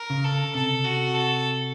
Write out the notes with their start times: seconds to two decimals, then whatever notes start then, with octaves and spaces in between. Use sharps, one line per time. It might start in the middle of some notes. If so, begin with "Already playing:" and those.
Already playing: A#4
0.10 C#3
0.24 A4
0.55 C3 A4
0.85 F#4
1.15 A4